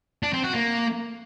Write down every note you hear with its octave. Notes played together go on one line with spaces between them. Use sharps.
D4
C4
F#4
A#3